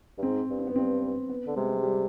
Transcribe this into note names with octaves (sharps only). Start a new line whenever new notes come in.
G2
G#2 C4
G2
C4
B3
G2 C4
B3
D3
C3 G#3
G#3
G3